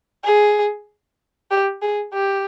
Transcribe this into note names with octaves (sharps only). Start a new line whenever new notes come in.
G#4
G4
G#4
G4